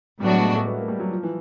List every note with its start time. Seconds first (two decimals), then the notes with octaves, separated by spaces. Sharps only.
0.20 A2 F#3 G3 B3 D4 F#4
0.31 G#3
0.43 G#3
0.55 A3
0.66 B3
0.78 A#3
0.88 G3
1.00 F#3
1.11 F3
1.23 E3